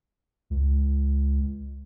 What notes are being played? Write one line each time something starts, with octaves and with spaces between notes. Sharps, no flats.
C#2